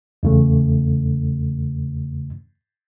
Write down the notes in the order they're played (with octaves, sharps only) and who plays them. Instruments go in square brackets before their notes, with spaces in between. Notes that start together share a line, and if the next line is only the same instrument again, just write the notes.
[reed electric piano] E2 C#3 A3